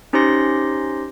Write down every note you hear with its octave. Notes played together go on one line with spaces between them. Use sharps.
C#4 D#4 G4 C5 C6 A#6